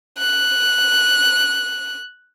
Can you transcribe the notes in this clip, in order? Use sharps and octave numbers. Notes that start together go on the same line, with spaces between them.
F#6